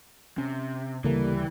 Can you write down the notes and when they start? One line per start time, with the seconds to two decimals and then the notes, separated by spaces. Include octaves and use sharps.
0.38 C3 C#4
1.04 D2 C#3 E3 G3 A#3 A4 A#4